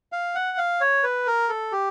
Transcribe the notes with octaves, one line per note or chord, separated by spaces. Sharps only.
F5
F#5
F5
C#5
B4
A#4
A4
G4